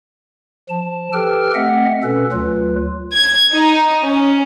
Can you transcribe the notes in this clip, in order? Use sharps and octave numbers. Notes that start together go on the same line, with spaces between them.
F3 A5
G4 A4 B4 G5 F6
A3 C4 D#5 E5 F#5
B2 C#4 A4 B4
D2 F#3 F4 B4
G#6
D#4
C#4